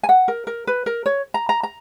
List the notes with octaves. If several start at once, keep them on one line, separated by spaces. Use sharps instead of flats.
G#5
F#5
A#4
A#4
B4
A#4
C#5
A#5
A#5
A#5